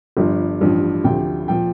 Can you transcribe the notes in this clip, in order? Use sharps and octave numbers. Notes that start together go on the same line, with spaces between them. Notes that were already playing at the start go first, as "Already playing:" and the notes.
G1 G2 F3
A1 G2 F3
D2 C3 F3 G5
A#2 F3 G5